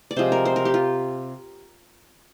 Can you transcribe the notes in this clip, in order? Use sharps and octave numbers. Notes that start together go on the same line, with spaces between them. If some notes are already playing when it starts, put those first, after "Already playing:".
D5
C3 F3 G#3 C5
A#4
C5
A#4
G4
F4